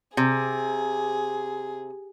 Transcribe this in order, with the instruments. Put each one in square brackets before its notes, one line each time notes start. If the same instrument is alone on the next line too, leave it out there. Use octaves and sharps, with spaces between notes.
[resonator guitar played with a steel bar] C3 [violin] G#4